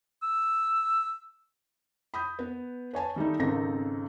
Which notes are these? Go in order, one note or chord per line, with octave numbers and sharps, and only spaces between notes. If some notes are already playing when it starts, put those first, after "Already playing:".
E6
B5 D#6 G6
B3 B4
B4 C#5 G#5 A5
D#3 G3 A3 D#4
G#1 C#3 C4 D#4 A4 A#6